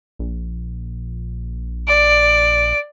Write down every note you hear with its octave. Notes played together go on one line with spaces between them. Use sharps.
A#1
D5 D7